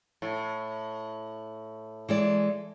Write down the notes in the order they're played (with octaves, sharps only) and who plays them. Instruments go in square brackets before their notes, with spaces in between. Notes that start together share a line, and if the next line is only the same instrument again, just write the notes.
[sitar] A2
[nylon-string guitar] E3 G#3 D5